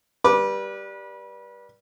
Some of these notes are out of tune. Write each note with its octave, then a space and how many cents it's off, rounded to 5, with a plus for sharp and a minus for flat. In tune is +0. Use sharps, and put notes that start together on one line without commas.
G3 +0 B4 -30 D6 +0